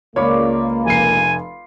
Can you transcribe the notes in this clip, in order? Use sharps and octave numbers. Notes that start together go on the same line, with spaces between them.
C#2 A#3 F4 C#5 D5 B5
F1 G#5 C7